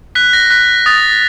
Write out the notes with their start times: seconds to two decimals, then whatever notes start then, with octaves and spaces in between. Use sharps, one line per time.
0.15 F#6 B6
0.33 A#6
0.50 F#6 B6
0.86 D#6 A6